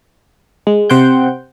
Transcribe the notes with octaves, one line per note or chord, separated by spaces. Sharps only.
G#3
C3 C5 F#5 G5 G6